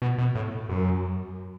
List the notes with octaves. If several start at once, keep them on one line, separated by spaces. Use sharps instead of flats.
B2
B2
A2
F#2